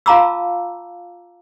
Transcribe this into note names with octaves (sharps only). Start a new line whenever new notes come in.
F4 F5 A5 A#5 D6 E6